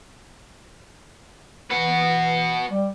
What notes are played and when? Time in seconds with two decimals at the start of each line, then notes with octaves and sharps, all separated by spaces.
1.70 E3 F#4 B4
2.69 G3